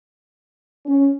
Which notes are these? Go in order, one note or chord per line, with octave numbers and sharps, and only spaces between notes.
C#4